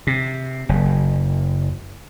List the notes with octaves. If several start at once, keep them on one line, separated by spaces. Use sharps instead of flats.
C3
F#1